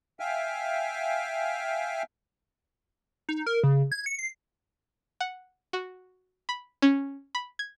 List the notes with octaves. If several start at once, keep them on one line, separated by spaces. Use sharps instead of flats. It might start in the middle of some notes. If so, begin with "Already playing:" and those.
E5 F5 G5 G#5 F6
D#4
A#4
C#3
G#6
C#7
C7
F#5
F#4
B5
C#4
B5
G#6